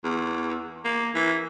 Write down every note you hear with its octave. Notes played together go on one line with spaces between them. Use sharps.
E2
A#3
E3